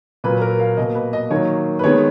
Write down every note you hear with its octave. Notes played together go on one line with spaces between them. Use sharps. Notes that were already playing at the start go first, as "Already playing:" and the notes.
A#2 F#3 A#3 B4
A#4
F5
B2 A#3 D#5
B4
D#5
D#3 F#3 A#3 C#5
B4
D#3 G#3 B3 C#5